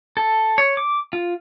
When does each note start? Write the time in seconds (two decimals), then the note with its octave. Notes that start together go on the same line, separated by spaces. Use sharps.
0.17 A4
0.58 C#5
0.77 D6
1.13 F4